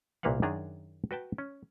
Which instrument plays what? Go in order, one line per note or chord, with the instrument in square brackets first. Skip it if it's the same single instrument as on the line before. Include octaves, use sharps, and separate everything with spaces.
[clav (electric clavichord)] C2 A#2 A#3 B4 F5 F#5
F#2 D#3 D4 G#4 A#5
F#4 B4 G5 A5
C#4